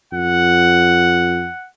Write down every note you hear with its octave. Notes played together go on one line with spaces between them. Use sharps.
F2 F#5